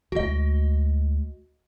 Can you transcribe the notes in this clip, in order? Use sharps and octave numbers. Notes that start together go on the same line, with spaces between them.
D2 G#3 F#4 D#5